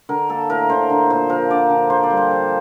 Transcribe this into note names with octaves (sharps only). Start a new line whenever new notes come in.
D3 A#4
A#3 A4
A2 A#4
D3 C5
D3
A#2 C5
F3 A#4
D3 D5
D3
A#3 C5
D5
G3
C5
F3